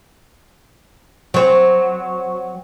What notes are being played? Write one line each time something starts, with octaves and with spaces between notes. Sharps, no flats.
F#3 C4